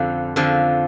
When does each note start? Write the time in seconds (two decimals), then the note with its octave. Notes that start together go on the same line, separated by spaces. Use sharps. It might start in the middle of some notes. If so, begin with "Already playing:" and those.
Already playing: F2 D3 F3 F#5
0.36 F2 D3 F3